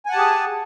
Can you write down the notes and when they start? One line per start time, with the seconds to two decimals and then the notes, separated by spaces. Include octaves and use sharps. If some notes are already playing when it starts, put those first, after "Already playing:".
0.06 G#5
0.09 F#5
0.12 A5
0.15 G4
0.18 G#4